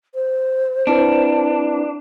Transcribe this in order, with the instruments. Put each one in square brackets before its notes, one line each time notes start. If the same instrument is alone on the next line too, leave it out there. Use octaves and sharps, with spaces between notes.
[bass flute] C5
[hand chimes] C4 E4 B4 [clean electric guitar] D4